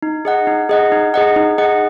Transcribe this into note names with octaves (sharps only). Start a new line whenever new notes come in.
D#4
G#4 D#5 F#5
D#4
G#4 D#5 F#5
D#4
G#4 D#5 F#5
D#4
G#4 D#5 F#5